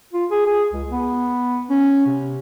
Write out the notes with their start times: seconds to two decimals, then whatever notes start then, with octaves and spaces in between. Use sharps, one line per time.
0.13 F4
0.31 G#4
0.46 G#4
0.72 C#2
0.90 B3
1.70 C#4
2.06 C3